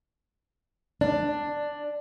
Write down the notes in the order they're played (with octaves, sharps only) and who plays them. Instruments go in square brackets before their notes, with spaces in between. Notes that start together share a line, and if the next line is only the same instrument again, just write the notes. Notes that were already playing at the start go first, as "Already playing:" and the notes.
[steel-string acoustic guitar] D4